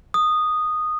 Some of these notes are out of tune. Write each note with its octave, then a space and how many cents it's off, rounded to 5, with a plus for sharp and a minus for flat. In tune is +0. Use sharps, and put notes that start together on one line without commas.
D#6 -10